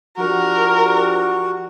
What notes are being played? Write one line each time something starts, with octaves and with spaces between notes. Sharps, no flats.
F3 D4 F#4 G4 A#4